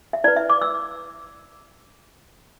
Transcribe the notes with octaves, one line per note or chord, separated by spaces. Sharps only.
E5
E4 B4 D5
E5
D6
E6